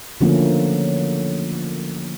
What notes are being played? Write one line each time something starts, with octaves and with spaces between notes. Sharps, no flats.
D3 F3 F#3 A3 A#3 C#4